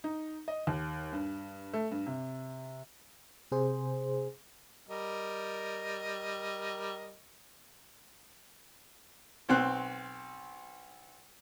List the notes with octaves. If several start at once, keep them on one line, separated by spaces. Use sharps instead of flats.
D#4
D#5
D#2
G2
A3
G2
C3
C3 G#4 C5
G3 A#4 D#5
B1 C4 F#6